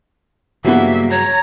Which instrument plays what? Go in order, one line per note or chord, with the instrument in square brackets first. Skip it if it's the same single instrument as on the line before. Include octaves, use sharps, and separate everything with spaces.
[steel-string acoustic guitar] G2 C#3 F#3 [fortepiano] E3 G3 B3 [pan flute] A#3 [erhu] E5
[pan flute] C#5 [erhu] A#5